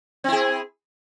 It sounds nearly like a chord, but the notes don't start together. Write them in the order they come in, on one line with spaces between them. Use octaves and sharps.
C4 E4 G#4